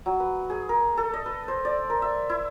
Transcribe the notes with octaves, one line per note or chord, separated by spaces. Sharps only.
F#3
B4
G#4
A#4
A4
D#5
B4
C5
D5
A#4
E5
E4